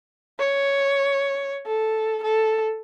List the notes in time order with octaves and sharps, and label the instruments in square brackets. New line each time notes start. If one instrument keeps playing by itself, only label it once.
[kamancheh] C#5
A4
A4